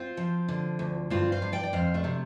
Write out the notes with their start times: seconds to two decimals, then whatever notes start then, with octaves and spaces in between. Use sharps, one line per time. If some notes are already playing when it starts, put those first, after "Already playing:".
Already playing: C4 F4
0.17 F3
0.48 D3
0.79 D2
1.10 G2 C4 F4
1.32 C5 F5
1.42 G2
1.52 D5 G5
1.63 D5
1.73 F2 C5 F5
1.94 A3 D4
2.04 C3